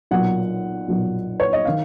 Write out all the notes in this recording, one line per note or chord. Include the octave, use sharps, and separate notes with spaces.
B1 A#2 F#3 F#5
B1 A#2 F#3
C#5
D#5
D#3 F5